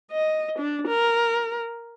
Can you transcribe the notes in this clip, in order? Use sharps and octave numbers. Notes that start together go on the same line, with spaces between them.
D#5
D4
A#4